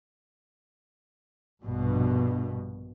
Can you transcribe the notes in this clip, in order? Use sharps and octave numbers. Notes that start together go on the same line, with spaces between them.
A#1 G2 B2